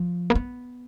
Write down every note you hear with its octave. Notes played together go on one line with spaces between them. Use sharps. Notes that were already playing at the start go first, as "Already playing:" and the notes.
Already playing: F3
A#3
B3